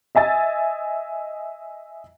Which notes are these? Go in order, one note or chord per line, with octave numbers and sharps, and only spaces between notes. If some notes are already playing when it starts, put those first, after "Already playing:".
D#5 E5 G#5 A6